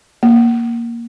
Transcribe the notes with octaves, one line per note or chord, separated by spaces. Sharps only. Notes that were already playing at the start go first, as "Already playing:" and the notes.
A#3